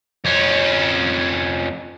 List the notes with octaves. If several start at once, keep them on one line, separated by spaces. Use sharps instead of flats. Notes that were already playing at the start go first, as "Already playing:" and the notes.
F2 C#4